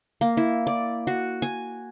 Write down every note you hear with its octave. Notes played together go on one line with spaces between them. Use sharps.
A#3
E4
D5
F#4
G#5